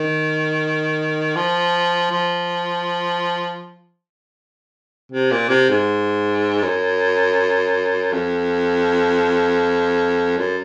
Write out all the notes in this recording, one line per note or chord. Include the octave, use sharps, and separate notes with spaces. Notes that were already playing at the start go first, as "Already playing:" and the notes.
Already playing: D#3
F3
F3
C3
A#2
C3
G#2
F#2
F2
F#2